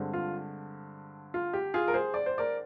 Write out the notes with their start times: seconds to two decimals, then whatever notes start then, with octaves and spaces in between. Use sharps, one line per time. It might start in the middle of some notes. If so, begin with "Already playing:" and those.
Already playing: G2 D3 G#3 C4
0.13 F4
1.34 F4
1.53 G4
1.74 F4 G#4
1.88 A#4
1.94 G#4 C5
2.14 D5
2.26 C5
2.38 A#4 D5